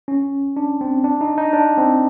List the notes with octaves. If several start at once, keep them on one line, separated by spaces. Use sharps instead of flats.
C#4
D4
C4
D4
D#4
D#4
D4
C4